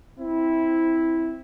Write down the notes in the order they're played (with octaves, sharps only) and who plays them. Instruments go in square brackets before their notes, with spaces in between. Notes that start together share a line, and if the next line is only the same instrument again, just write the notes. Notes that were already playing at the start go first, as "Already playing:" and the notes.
[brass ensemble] C4 E4